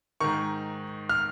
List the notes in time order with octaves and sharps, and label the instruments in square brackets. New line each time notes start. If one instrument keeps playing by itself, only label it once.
[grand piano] G#2 D#3 C#6
F6